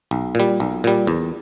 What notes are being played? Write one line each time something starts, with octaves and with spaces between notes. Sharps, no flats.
B1
A#2 G3
B1
A#2 G3
E2